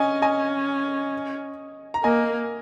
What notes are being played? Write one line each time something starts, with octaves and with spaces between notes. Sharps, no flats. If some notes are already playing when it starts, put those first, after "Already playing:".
Already playing: C#4 D#5 G#5
D#5 G#5
A#5
A#3 D#5 G#5